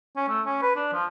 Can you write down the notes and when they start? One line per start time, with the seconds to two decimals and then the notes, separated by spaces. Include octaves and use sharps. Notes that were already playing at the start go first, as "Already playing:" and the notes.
0.17 C#4
0.29 A3
0.46 C#4
0.62 B4
0.76 D4
0.93 F3